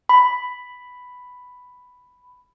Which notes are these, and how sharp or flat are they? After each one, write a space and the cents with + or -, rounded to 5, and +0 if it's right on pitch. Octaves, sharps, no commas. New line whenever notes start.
B5 +5